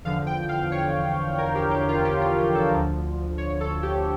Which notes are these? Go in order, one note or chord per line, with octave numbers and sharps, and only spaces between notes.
E2 D3 F3 F5
G5
F5
C#5
A#4
G4
G4
F4
G4
F4
F4
A4
D2 D3 F3
C#5
A4
G4